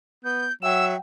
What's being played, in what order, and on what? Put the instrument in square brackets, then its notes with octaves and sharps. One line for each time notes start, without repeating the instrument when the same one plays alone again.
[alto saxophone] B3 [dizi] G6
[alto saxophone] F#3 [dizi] E5 [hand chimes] F#5 G5 [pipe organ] E6